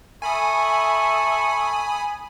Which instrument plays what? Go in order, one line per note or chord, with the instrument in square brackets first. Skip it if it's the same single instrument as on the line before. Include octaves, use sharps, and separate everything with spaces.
[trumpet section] A4 E5 C#6 [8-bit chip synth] G#5 B5 D#6